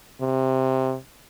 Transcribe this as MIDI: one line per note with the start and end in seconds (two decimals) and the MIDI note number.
0.21 0.96 48